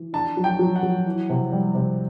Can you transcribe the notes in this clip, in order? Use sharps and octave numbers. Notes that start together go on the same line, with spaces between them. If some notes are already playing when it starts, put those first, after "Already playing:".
Already playing: E3
D4 A5
F#3
G5
F#3
F#5
F#3
E3
C3
G3
C3